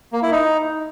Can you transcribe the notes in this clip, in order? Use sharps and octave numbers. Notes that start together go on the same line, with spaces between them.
A#3
E4
D#4